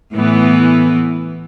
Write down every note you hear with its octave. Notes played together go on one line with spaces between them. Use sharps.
A2 E3 B3